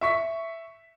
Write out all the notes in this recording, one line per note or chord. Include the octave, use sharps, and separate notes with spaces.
E5 C#6 B6